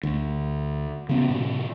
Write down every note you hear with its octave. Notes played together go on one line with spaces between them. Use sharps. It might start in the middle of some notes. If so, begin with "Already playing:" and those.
D2
C#3 B3 C#4
A2 C3